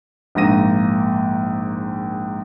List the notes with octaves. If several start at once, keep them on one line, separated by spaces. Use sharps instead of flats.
A#1 G#2 A#3 A#6 D#7